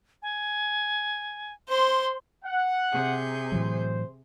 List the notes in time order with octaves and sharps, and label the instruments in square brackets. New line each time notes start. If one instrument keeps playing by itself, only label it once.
[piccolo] G#5
[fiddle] C5 C6
[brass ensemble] F#5
[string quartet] C3 G#4 G6
[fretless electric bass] A2 E3 F#3 [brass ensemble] C5